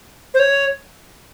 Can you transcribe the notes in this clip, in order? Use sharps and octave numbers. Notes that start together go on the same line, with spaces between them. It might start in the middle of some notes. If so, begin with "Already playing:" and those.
C5
C#5